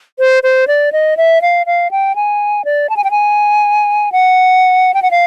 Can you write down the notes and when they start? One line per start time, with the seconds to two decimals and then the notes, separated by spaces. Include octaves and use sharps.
0.19 C5
0.43 C5
0.68 D5
0.93 D#5
1.17 E5
1.42 F5
1.66 F5
1.91 G5
2.16 G#5
2.65 D5
2.89 A5
2.97 G#5
3.04 G5
3.11 G#5
4.12 F#5
4.94 G5
5.02 F#5
5.11 F5